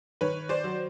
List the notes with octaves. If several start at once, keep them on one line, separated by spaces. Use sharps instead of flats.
D#3 B4 C#5
C5 D5
F#3